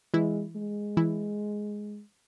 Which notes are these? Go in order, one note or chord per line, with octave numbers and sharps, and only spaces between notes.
E3 G#3 E4
G#3
E3 E4